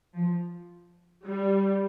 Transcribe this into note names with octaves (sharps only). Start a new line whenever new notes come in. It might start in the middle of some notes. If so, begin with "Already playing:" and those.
F3
G3